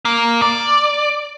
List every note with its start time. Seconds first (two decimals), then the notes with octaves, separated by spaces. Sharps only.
0.05 A#3
0.42 D5